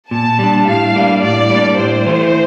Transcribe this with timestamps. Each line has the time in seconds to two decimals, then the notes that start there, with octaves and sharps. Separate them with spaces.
0.11 A#2 A5
0.39 G3 D4
0.67 A2 F5
0.95 G3 A#3 D4
1.23 A2 D5
1.50 G3 A#3 D4
1.78 A2 C5
2.06 E3 A3